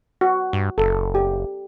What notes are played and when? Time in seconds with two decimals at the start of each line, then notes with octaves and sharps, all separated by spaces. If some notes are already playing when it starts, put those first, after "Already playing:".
0.21 F#4
0.53 G2
0.78 F#1 A4
1.15 G4